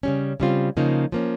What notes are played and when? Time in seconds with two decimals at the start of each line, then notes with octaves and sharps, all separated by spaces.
0.03 C#3 G3 C#4
0.40 C#3 G3 C4 F4
0.77 C#3 F3 A#3 D#4
1.12 F3 A#3 C#4